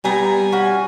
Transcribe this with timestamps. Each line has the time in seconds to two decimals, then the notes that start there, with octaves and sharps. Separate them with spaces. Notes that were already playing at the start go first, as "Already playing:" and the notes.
0.04 G3 B3 G#5 A#5
0.52 C#4 F#4